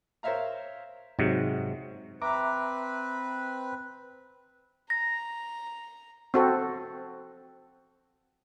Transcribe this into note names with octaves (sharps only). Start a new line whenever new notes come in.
A#4 C5 C#5 E5 F5 A#5
G#2 C3 F#3
C4 B4 E5 A#5 D6
A#5 A#6
C4 F#4 A4